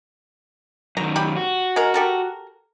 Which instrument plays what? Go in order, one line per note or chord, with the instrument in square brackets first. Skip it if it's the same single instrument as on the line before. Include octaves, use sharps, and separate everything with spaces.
[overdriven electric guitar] F#2 D#3 [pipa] A#5
[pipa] G4 B5
[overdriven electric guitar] F#4
[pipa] G#3 A#4
G4 A4 A#4